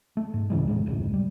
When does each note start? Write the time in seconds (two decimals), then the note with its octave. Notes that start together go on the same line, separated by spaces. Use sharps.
0.17 A3
0.34 G#2
0.50 C#2 C#3 E3 G#3
0.68 F1 E2 A2 G#3
0.86 F1 D2 G#2 C3
1.14 G3